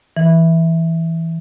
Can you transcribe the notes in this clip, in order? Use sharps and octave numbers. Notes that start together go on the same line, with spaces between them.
E3